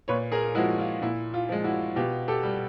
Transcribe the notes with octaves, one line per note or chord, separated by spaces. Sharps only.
A#2 B4 C#5
G#4 A#4
F3 G#3 E4 F#4
F4
A#2 E4
F4
F3 G#3
E4 F#4
B2 F4 G4
G4 A4
G3